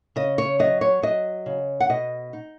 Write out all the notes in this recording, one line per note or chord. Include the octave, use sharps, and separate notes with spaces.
C#3 D#5
C#5
F#3 D#5
C#5
F#3 D#5
C#3
F#5
B2 D#5
D#4